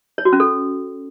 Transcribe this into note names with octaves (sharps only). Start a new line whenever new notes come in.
C#5
F#4
C#4
A4